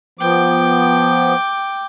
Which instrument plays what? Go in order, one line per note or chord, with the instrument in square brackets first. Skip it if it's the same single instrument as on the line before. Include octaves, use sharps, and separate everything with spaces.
[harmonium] F3 B3 [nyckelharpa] G5 D6